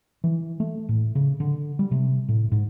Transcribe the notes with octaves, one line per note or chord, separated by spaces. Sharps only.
E3
A3
A2
C#3
D3
G3
C3
A2
G#2